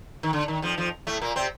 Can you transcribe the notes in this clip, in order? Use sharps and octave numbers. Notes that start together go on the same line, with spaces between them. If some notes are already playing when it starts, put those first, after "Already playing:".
D#3
D3
D#3
F2 F3
F2 F3
A2 A3
A#2 A#3
C3 C4